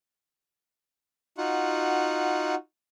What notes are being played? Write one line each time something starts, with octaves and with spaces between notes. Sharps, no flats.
D#4 F4 F#4 F#5